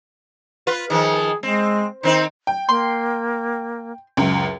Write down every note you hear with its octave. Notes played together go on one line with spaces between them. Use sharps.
F4 B4
D#3 F3 G#4
G#3 C4
D#3 C4 D#4 C5
G5
A#3 C6
C#2 F#2